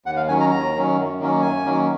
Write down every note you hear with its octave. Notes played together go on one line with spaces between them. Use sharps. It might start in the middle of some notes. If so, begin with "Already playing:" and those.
D#2 F#5
F5
D#3 F#3 C#4 G#5
A#5
D#2 A#5
D#3 F#3 C#4
F#2
D#3 F#3 A#3 C#4
F#2 G#5
D#3 F#3 A#3 C#4